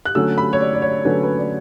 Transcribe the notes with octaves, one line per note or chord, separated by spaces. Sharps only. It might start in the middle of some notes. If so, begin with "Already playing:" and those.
F#6
D3 F#3 A3 C#4 E6
B5
C#5
D5
D5
C#5
D3 F#3 A3 C#4 B4
B4
D5